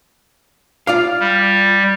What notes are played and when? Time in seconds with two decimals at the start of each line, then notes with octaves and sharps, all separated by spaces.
0.87 F4 D5 F5
1.20 G3